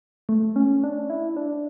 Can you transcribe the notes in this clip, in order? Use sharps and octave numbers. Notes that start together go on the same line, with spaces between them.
A3
C#4
D4
E4
D4